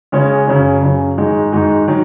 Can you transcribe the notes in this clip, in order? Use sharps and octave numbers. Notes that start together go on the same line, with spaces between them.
C#3 G#3 C#4
F#2 C#3 F#3 C#4
F#2 C#3 F#3 C#4
G#2 D#3 G#3 D#4 F#4
G#2 D#3 G#3 D#4 F#4
D#3 F#3